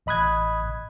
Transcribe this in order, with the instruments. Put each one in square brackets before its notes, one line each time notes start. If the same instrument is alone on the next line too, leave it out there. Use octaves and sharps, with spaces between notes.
[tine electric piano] A1 D#5 B5 D#6 F#6 G#6